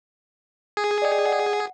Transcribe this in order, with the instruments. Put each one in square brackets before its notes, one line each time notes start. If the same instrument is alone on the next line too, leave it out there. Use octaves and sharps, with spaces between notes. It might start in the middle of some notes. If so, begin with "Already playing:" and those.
[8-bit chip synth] G#4
[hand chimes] D5 D#5 G5
F#5